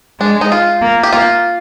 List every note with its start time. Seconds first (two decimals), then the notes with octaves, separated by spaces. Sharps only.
0.20 G#3 D4
0.41 D#4
0.52 F4
0.82 A#3
1.03 G4
1.13 A#3 F4